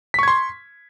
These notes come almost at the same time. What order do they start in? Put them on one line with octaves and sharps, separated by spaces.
B6 C#6 G#6 C6